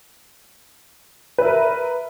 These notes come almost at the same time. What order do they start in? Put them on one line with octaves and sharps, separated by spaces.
B4 E5 A#4